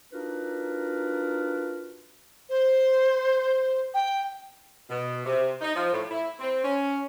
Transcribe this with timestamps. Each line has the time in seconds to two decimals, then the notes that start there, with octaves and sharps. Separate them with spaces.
0.13 D4 D#4 F4 F#4 A#4 B4
2.49 C5
3.94 G5
4.90 B2
5.25 C3
5.61 D#4
5.75 F3
5.92 A2
6.11 E4
6.39 C4
6.64 C#4